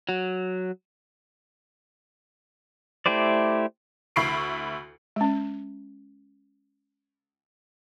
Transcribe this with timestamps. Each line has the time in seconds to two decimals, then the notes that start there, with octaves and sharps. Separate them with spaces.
0.09 F#3
3.06 A3 E4 G4 C5 D5
4.16 D2 E4 B5 C#6 C7 D7
5.16 G#3 C#4